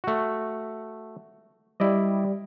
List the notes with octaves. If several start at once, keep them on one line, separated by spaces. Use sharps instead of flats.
A3 F#4
G3 E4 D5 D#5